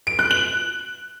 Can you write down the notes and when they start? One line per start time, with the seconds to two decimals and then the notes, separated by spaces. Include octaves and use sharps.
0.07 D7
0.19 F#6
0.31 F#7